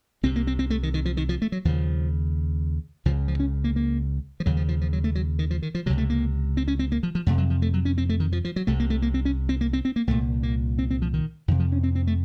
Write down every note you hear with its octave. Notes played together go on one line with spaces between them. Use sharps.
C2 C3 C4
A#3
C4
C4
A3
D#3
D#3
F3
D#3
F3
A3
F#3
D#2 C#3 F3
C#2 C#3 F3
F3
C#4
A#3
A#3
F3
D#2 C#3 F#3
F3
F3
F3
F#3
A3
F#3
D#3
F3
D#3
F3
C#2 C3 F#3
A3
A#3
C4
C#4
C4
A#3
F3
F3
F2 C3 A3
F#3
F3
A3
F#3
C#4
C4
A3
D#3
F3
F3
F#3
C2 C3 A3
A#3
A3
A#3
C4
C#4
C4
A#3
C4
C4
A#3
C2 A#2 A3
A#3
C4
C4
F3
D#3
F2 C3 D#3
F3
C#4
C4
C4
A3